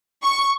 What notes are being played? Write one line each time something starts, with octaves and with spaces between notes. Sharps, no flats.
C#6